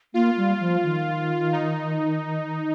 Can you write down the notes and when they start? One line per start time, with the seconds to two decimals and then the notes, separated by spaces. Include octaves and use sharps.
0.14 A#3 F4
0.37 G3
0.60 F3
0.83 D#3
1.53 D#4